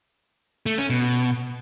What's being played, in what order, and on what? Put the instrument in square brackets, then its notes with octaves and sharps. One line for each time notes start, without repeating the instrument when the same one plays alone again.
[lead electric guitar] A3
C#4
B2